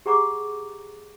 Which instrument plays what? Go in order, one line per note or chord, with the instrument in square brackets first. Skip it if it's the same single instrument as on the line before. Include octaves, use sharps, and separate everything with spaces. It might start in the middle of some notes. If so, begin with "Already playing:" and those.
[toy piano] G4 G#4 F#5 A#5 C#6 D6